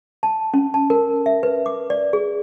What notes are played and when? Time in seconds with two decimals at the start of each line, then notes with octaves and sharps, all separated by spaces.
0.23 A5
0.54 C#4
0.74 A5
0.90 A#4
1.26 E5
1.43 B4
1.66 D6
1.90 D5
2.13 G#4